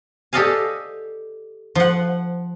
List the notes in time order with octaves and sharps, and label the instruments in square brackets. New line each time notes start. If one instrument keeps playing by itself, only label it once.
[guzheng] G4 A4 D5 D#5 F5 G#5
F3 F#5